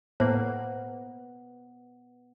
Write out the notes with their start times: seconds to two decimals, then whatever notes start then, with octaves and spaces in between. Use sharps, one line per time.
0.20 A2 A#3 B3 C5